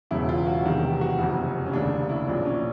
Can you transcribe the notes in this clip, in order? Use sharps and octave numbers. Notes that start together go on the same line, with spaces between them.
E1 E2 C#3 F#3 E4
F4
F#4
F1 E2 C3 D#3 F#3
G4
F#4
F#1 F2 C3 F#4
C#4
F1 D#2 C#3 D4
E4
B1 A#2 F3 D4
C#4